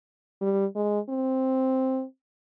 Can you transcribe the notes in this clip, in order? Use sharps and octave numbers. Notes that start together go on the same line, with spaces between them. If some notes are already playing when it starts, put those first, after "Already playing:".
G3
G#3
C4